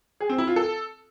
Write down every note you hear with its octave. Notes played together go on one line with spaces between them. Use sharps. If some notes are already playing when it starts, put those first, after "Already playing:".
G#4
C4
E4
F4
A4